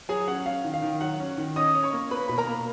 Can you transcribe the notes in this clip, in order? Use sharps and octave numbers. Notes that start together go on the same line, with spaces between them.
F#3 G#4 G#5
C#4 F#5
C#4 F5
D#3
F5
D#3
F#3 F#5
C#4
D#3
C#4 D#5 D#6
C#4
C#5 C#6
A#3
A#3 B4 B5
B2 B5
A#4 A#5
A#3